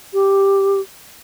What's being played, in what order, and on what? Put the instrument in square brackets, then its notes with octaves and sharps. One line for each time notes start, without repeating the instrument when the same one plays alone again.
[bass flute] G4